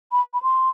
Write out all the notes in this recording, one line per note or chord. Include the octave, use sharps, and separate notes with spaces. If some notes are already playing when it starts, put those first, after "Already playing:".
B5
B5
C6